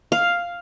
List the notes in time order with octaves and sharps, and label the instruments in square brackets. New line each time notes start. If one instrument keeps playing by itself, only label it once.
[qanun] F5